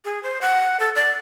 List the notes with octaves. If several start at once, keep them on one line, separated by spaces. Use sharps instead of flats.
G#4
C5
F#5
A4
D5